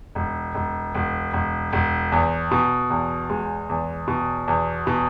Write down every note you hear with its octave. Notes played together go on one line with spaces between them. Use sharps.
E1
E1
E1
E1
E1
E2
B2
E2
G#3
E2
B2
E2
B2